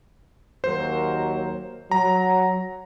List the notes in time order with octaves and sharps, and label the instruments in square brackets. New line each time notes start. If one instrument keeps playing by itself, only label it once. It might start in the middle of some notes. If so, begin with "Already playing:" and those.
[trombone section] D#2 F#3 A#4 [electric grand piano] C5
[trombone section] F#3 [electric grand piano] A#5